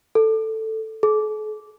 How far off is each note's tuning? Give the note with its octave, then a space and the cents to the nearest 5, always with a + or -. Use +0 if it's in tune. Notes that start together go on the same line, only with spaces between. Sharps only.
A4 +5
A4 -45